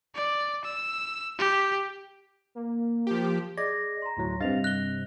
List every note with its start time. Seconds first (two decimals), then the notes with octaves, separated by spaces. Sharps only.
0.15 D5
0.65 E6
1.39 G4
2.55 A#3
3.07 F3 G4
3.58 G#4 D5 D#5 G#6 A#6
4.02 A#5 C6
4.17 D2 A2 F#3
4.40 G2 C3 D#5 F5 A6 F7
4.64 F#6 A#6 G7